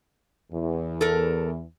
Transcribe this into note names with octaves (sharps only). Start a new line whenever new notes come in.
E2
A4 A#4